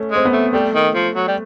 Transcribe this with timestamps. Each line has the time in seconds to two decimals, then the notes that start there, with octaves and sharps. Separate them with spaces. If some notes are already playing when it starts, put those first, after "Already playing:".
Already playing: A3 C#4
0.11 G#3 C4
0.25 B3
0.32 A3
0.53 G3 A3
0.74 D#3
0.95 F3
1.15 F#3
1.28 G3